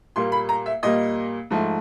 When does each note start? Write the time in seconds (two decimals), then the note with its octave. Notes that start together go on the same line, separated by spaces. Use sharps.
0.16 A#2 G3 A#3 C6
0.32 B5
0.49 A#5
0.66 E5
0.83 A#2 G3 A#3 D#5
1.51 G#2 F3 A3